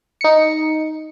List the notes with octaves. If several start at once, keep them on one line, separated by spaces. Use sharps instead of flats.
D#4 C#7